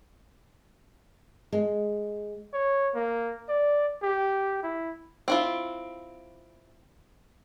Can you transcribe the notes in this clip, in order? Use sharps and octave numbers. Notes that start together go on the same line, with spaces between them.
G#3
C#5
A#3
D5
G4
E4
C4 E4 F4